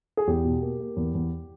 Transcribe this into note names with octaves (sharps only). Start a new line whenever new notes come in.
G#4
E2 G4
B2
A#3
A#3
E2
E2